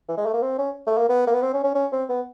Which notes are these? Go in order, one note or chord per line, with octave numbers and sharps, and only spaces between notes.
E3
G#3
A3
A#3
C4
C#4
A3
A#3
B3
A#3
B3
C4
C#4
C#4
C#4
C4
B3